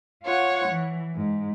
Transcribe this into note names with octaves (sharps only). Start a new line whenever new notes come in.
F4 C#5 F#5
E3
G#2